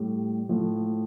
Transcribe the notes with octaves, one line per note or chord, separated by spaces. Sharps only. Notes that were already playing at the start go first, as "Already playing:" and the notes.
Already playing: A2 G3
A2 F3